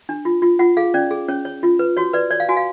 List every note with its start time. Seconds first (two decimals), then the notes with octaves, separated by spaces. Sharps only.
0.09 D4
0.25 F4
0.42 F4
0.59 F4 F#5
0.77 G#4 F5
0.94 C#4 D5
1.11 G#4
1.28 C#4 C#5
1.45 C#5
1.63 F4
1.79 B4
1.97 F#4 C#5
2.13 B4 D5
2.31 C#5 D5
2.40 F5
2.49 F#4 G#5
2.57 F5